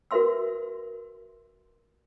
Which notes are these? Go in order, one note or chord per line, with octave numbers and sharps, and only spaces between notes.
F#4 A#4 B4 E5 C6 E6